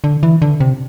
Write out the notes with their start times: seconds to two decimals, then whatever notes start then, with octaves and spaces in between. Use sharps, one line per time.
0.04 D3
0.23 E3
0.42 D3
0.60 C3